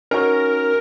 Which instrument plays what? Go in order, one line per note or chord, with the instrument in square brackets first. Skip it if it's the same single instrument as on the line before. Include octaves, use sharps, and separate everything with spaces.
[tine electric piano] C#4 D#4 F#4 [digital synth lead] A#4